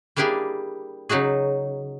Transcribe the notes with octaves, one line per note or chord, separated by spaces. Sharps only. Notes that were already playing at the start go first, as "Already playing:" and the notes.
G3 A#3 D4 E4 G4 G#4
C#3 F#3 D#4 F#4 G#4